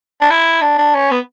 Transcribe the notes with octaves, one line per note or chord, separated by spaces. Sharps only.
D4
E4
D4
D4
C#4
B3